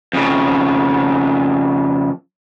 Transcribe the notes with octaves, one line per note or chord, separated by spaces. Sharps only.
F2 C#3